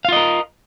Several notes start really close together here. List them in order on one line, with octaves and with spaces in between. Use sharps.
F5 F4 D#5 A#4